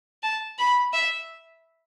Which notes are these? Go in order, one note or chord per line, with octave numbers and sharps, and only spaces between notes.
A5
B5
E5